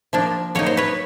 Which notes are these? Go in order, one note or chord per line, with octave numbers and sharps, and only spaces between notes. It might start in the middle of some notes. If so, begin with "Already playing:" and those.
F3 A#3 D4
F#3 A#3 D#4 C#5
C5
B4 C#5